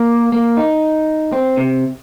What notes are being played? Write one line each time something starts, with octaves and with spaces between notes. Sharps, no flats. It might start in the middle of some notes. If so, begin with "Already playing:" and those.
Already playing: A#3
A#3
D#4
C4
C3